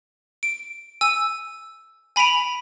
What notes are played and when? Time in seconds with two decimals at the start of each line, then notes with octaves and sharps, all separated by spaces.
0.43 D7
1.01 G#5 E6
2.16 G#5 B5 B6 D7 F7